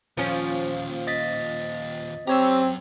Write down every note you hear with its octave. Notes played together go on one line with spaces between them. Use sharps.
D#2 A#2 F3 C#4
D#5 A6 B6
F#2 C4 G4 C#5 A#5 E6